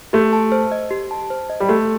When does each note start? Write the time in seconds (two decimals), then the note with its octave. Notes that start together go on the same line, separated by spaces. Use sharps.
0.13 A3 G4
0.33 A5
0.52 C5
0.72 D#5
0.91 G4
1.11 A5
1.30 C5
1.50 D#5
1.60 G3
1.69 A3 G4